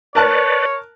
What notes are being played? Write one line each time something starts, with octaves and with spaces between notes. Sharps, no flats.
A#4 B4 C#5 D5 A5 F#6